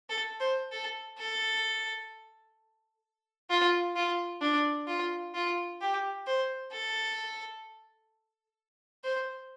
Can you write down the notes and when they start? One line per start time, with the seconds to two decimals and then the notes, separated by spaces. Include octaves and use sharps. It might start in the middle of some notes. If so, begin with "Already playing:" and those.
0.10 A4
0.40 C5
0.72 A4
1.19 A4
3.50 F4
3.96 F4
4.42 D4
4.87 F4
5.34 F4
5.81 G4
6.27 C5
6.73 A4
9.04 C5